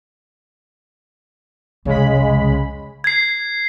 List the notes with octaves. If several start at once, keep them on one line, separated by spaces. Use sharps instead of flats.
C2 F2 C#3 G#3 B5
G#6 C7